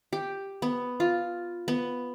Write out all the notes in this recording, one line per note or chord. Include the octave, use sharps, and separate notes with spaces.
G4
B3
F4
B3